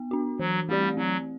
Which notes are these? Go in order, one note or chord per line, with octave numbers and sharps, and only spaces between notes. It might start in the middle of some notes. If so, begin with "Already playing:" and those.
Already playing: B3
D4 F#4
E3 F#3
G3 A3 C4 G4 D5
F#3 C4